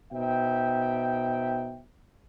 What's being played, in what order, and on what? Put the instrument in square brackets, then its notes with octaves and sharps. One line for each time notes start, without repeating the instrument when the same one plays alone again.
[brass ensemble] B2 D#4 C5 E5 G5